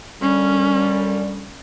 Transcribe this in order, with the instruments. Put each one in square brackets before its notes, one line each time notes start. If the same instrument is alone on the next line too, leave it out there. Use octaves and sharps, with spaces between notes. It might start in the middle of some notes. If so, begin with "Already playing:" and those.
[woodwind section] F#2 D3 G3 [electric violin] C#4